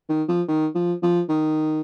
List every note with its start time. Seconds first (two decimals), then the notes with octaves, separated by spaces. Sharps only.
0.09 D#3
0.28 F3
0.48 D#3
0.75 F3
1.03 F3
1.29 D#3